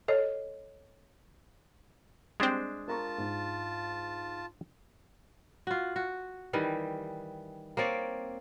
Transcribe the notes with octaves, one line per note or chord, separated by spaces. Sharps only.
A4 C#5 D#5
G3 G#3 C4 D4 C5
F4 A#4 A5 A#5 C#6
G#2
F4 F#4
F#4
D#3 E3 G3
A#3 C4 C#5 D5